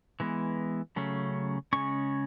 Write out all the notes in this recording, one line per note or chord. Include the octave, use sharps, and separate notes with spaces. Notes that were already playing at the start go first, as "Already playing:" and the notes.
E3 G#3 B3
C#3 F#3 A3 C#4
C#3 G#3 C#4 C#6